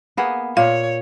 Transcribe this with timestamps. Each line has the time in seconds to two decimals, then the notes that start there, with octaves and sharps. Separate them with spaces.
0.17 A#3 B3 G#4
0.57 A#2 C#5 F5